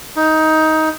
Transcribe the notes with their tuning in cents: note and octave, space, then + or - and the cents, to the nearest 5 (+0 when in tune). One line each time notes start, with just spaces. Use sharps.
D#4 +15